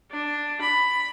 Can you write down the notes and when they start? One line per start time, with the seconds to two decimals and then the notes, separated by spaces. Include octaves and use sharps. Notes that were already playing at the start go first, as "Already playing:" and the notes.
0.11 D4
0.61 B5